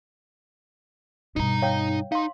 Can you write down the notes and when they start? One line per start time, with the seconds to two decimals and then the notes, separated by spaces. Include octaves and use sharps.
1.36 G2 B2 D#4 A#5
1.62 C#5 F5 G5
2.12 D#4 F5 C6